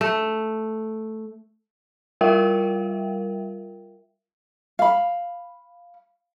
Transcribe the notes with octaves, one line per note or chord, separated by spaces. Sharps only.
A3
G3 F4 A#4 E5 F5 G5
F5 B5